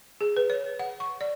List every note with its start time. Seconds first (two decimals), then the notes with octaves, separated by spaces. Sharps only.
0.21 G#4
0.37 B4
0.50 C#5
0.79 F#5
1.00 C#6
1.21 D5